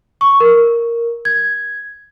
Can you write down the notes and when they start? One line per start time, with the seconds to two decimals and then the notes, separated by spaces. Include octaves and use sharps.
0.21 C#6
0.40 A#4
1.25 G#6